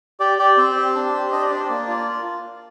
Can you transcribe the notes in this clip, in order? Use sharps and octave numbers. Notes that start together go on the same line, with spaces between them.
G4 D5
G4 D5
C4 C5
G4
D4
G4
D4 D#5
D5
D4 C5
D5
A#3
F4